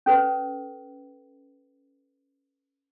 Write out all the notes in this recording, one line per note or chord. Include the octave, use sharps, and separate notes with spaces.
C#4 A4 B4